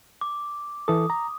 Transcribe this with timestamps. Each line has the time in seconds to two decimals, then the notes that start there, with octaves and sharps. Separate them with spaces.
0.21 D6
0.88 E3 A4 D#6
1.10 A#5